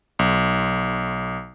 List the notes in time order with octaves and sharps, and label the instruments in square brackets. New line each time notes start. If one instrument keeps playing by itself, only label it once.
[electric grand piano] B1